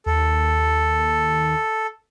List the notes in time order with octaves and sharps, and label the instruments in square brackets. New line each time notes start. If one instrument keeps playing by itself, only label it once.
[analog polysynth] D#2 [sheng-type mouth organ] A4